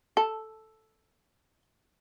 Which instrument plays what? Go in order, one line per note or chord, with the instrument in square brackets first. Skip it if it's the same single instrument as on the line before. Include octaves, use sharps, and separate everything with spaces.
[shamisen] A4